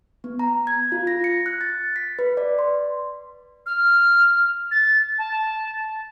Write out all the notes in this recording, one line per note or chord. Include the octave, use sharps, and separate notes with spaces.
B3
A#5
G#6
F4
A#6
C#7
F#6
A6
B6
B4
D5
C6
F6
A6
A5